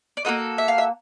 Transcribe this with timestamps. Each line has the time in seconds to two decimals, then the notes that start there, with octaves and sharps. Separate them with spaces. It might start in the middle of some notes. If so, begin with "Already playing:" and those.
0.17 D5
0.25 A#3 D#4 F#4 A4 D#5
0.58 E5
0.68 F5
0.78 E5